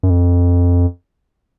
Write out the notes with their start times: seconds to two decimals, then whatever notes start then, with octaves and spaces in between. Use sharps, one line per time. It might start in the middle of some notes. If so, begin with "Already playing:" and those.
0.03 F#2
0.10 F2